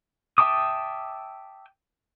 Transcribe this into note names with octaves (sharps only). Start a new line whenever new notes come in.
E5 G5 A5 D6 D#6